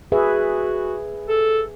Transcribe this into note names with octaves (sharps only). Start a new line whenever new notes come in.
F#4 G#4 B4 E5
A4